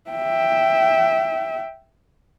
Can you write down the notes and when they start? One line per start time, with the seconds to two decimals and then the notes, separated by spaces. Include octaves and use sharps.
0.10 E5 G5